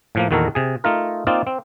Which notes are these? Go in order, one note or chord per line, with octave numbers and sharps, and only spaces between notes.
A2 F3 A#3
E2 A#2 D#3 F#4 A4 A#4
C3 G#4
A3 D#4 F4 A#4
A#3 C4 D#4 F4 D5
C4